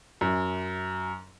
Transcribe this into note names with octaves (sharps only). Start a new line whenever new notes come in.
F#2